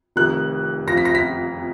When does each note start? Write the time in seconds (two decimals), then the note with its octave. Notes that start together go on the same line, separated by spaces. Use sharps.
0.16 F1 F2 D#3 F#6
0.87 F2 F3 A#6
0.97 B6
1.05 A#6
1.15 B6